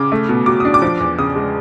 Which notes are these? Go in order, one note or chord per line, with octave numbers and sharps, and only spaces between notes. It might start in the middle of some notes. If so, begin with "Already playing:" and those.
Already playing: C#3 D6
A3
B2
F#3 D6
D4 D#6
D6
F3
E2
C#3 D#6
G#3